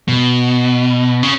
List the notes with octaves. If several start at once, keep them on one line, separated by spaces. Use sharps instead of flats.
B2
C#3